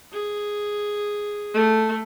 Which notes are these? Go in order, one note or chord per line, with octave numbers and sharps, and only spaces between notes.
G#4
A3